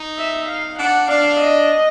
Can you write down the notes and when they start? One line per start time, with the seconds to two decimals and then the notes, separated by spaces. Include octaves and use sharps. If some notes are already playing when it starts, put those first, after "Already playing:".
Already playing: D#4
0.18 E5
0.49 F5
0.79 D4 F#5
1.09 D4 F5
1.40 D#5